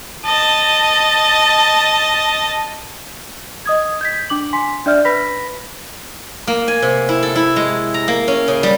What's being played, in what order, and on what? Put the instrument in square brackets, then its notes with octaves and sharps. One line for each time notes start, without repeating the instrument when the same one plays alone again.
[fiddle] D#5 A5
[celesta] D#5 D#6 G#6
G6 G#6 B6
D4 D6 F#7
G#5 C6 B6
D4 D5 E5 F6 G6
B4 B5 A#6 B6
[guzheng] A#3
G#5
C3
E4
A4
E4
G#3
A#5
A#3
C#4
C#3
G3